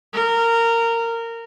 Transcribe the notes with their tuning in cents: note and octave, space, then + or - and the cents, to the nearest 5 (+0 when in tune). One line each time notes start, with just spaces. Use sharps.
A#4 -15